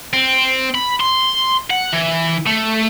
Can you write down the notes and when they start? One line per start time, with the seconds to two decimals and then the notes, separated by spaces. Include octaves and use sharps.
0.14 C4
0.75 B5
1.01 C6
1.70 F#5
1.92 E3
2.46 A3